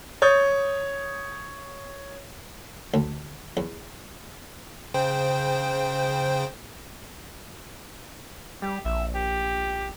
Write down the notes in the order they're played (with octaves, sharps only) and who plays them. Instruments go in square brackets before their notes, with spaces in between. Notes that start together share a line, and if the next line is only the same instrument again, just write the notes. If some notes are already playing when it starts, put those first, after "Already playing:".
[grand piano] C#5 D#6 G6 A6
[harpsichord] D2
E2
[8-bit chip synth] C#3 C5 G5
[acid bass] G3 [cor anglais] G4
[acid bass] A#1 [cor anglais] E5
[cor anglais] G4